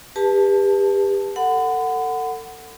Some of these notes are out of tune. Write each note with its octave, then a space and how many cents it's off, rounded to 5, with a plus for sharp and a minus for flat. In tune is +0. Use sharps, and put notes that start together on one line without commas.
G4 +30 B4 -20 A5 +0
A4 +35 F#5 +0 B5 +40